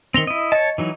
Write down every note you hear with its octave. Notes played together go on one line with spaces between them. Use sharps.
D#3 C4 A#6 F7 G7
E4 D#5
C#5 D#5 A5
E3 F#3 D#4